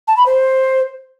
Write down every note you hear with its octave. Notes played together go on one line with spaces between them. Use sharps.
A5
B5
C5